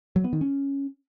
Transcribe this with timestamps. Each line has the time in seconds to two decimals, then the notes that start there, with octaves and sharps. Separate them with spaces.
0.16 F#3
0.24 B3
0.33 D#3
0.41 C#4